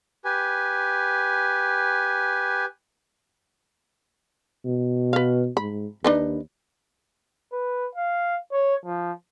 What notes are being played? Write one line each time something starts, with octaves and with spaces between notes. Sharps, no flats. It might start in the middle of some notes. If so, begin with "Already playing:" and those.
G4 B4 G#5
B2
B4 F5
G#2 B5
D#2 D4 D#4 B4
B4
F5
C#5
F3